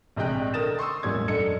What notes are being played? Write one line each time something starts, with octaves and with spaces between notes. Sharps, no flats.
A#1 C3 G#3 D#5 G5 F#6
D3 A#4 D#6 A6 E7
C6 C#6 D#6 E6
E1 A1 A#2 G3 C#4 G#6
F#2 D4 A4 D#5 C#7